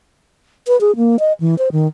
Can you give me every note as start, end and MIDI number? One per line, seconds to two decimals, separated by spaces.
0.67 0.79 71
0.81 0.95 68
0.96 1.19 58
1.19 1.33 75
1.40 1.57 52
1.58 1.69 72
1.72 1.87 51